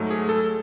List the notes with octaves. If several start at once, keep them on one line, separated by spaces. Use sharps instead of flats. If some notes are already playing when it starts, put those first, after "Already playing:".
Already playing: G#2 F#3 A3
G#4
A4